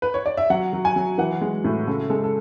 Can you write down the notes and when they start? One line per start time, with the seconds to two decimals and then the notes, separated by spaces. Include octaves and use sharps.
0.02 B4
0.14 C#5
0.26 D5
0.37 E5
0.50 F#3 F#5
0.73 F#3
0.85 G#5
0.96 F#3
1.18 E3 F#5
1.41 G#3
1.64 A2
1.87 C#3 A4
2.10 G#3 A4
2.24 A4